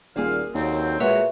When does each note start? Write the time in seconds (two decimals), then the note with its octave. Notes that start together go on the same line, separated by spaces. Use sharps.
0.16 D#1 A#2 A#3 G#4 F5
0.55 D#2 D3 F#3 C4
1.00 A#2 G#3 F#4 B4 C#5 E5